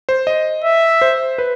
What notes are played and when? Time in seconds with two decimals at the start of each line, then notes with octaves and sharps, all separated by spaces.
0.09 C5
0.27 D#5
0.64 E5
1.02 C5
1.38 B4